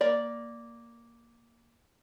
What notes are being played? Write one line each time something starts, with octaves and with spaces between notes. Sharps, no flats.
A#3 D5